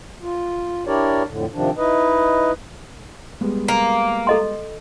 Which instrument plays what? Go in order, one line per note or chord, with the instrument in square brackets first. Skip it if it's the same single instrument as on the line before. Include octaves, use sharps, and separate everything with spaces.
[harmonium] F4
D4 E4 G4 A#4 C#5 D5
F2 A2 D3
C3 D#3 F3 D4
D#4 E4 B4 D#5
[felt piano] G3 G#3 B3
[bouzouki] A#3
[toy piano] A4 D#5 C6